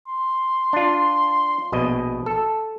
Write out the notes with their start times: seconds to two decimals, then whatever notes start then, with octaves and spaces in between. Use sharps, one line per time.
0.08 C6
0.73 D4 F4
1.72 A#1 B2 D#5
2.26 A4